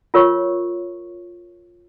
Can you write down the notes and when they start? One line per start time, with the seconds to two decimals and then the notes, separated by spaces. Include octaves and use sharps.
0.14 F4 A#4 C#5 C#6